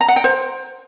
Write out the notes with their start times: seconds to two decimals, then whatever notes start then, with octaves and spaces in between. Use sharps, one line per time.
0.01 A#5
0.08 F#5
0.16 G5
0.24 C5